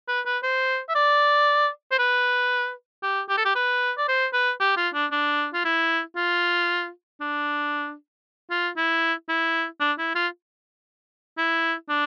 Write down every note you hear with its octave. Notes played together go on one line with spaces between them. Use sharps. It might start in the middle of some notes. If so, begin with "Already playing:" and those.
B4
B4
C5
E5
D5
C5
B4
G4
G4
A4
G4
B4
D5
C5
B4
G4
F4
D4
D4
F4
E4
F4
D4
F4
E4
E4
D4
E4
F4
E4
D4